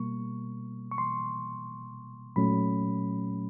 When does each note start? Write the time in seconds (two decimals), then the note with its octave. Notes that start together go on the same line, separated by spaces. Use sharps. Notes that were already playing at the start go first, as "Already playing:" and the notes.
Already playing: B2 G3 A#3 C#6
0.92 C#6
0.98 C6
2.36 A#2 F#3 A3 C#4 B5